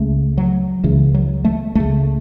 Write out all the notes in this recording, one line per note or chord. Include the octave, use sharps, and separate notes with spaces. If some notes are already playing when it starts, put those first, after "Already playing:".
Already playing: C#2 C#3 A3
F#3
C#2 C#3 E3
F#3
A3
C#2 C#3 A3